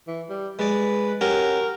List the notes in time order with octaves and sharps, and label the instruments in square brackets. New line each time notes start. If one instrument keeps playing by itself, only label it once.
[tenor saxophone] E3
G3
[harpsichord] G#3 D5 [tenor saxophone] B4
[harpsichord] C#4 F#4 G4 [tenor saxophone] A#4